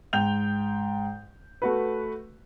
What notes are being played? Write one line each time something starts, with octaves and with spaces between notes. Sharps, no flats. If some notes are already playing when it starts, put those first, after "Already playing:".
G#2 G5 G6 F7
A3 F#4 B4